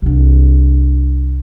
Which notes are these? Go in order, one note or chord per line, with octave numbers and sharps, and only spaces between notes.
C2 D4